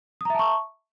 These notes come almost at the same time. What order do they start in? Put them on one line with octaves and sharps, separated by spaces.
D#6 A#5 E5 A5 C#6